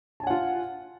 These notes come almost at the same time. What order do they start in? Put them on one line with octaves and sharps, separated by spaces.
A5 G#5 F#5 F4